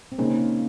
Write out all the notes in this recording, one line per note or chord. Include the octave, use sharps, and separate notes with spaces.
C4
C#3 G#3 A#3 C#4 D#4 G#4 C5